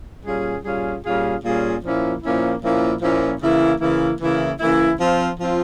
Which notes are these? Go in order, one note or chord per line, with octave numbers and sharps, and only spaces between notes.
A#2 G3 C#4 F4 G#4
A#2 G3 C#4 F4 G#4
A#2 G3 C#4 F4 G#4
A#2 G3 C#4 F4 G#4
A#2 F3 A#3 C#4 E4
A#2 F3 A#3 C#4 E4
A#2 F3 A#3 C#4 E4
A#2 F3 A#3 C#4 E4
C#3 E3 A#3 E4
C#3 E3 A#3 E4
C#3 E3 A#3 E4
C#3 E3 A#3 E4
F3 C4 F4
F3 C4 F4